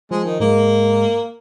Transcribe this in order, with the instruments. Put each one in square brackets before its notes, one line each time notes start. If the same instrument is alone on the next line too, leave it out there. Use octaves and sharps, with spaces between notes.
[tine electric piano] F3 [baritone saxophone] G#3
[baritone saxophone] D#3
[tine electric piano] G#2 G#3 [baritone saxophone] A#3